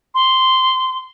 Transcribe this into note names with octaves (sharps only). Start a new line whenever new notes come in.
C6